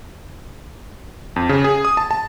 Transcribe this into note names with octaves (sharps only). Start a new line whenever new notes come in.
F2
C#3
G#4
D#6
A5
A5